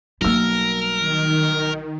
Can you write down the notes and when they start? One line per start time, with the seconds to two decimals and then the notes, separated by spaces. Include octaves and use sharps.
0.21 B1 G3 A#3 A#4 E6
0.99 D#3